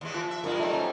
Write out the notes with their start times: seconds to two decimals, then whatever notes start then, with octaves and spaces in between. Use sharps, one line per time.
0.01 D#2 E3 G#3
0.14 F3
0.31 E5
0.44 G2 G3 G#3 F4 A#4
0.59 F#3 G3 A3 C4 D#4
0.73 C#4